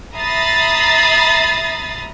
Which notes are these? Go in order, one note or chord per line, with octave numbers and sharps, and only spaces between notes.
E5 A#5 B5 D#6 A6 C7